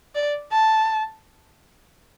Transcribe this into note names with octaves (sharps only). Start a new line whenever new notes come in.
D5
A5